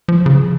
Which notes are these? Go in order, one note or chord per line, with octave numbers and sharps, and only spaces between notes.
F3
C#3